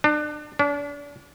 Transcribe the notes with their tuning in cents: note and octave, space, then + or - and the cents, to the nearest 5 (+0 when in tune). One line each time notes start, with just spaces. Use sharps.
D4 +30
D4 -35